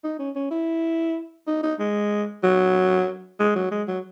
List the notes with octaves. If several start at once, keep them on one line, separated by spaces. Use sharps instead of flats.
D#4
C#4
C#4
E4
D#4
D#4
G#3
F#3
G#3
F#3
G#3
F#3